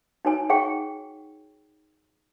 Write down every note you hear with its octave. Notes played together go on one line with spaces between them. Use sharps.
D#4 F#4 B4 C#5 G#5
D#4 G#4 C#5 F#5 G5 C#6